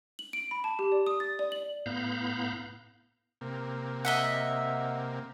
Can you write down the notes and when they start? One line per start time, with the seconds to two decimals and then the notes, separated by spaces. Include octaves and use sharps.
0.19 F#7
0.33 D7
0.51 B5
0.64 A5
0.79 G4
0.92 D5
1.07 D#6
1.20 A6
1.39 D5
1.52 F#7
1.86 A2 B3 F5 A#5 B5 G6
3.41 C3 A#3
4.05 D#5 E5 F#5